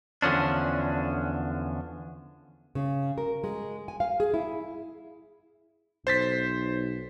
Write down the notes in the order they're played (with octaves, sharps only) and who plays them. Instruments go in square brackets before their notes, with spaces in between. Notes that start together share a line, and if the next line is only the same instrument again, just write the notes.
[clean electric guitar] E2 D3 F3 C#4 D4
[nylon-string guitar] C#3
A#4
G#3
G#5
F5
G#4
E4
[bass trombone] B1 [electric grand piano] C5 A6 B6